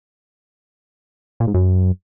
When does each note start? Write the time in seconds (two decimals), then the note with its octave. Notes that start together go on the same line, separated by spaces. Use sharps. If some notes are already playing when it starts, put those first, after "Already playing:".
1.40 A#2
1.47 G#2
1.54 F#2